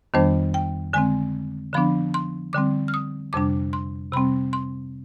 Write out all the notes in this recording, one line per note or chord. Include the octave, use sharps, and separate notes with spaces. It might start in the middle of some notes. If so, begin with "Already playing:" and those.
F2 D#3 G3 B3 D4 C5
G5
D3 G#3 C4 G#5
D3 F3 B3 D4 B5
C6
D3 G3 C4 D6
F6
D#6
F2 C3 G3 D4 D6
C6
C3 G3 C4 B5
C6